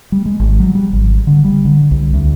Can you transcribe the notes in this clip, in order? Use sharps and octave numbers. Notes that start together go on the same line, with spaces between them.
G3
G#3
G#1
F#3
G3
G#1
D3
G3
D3
C2
D2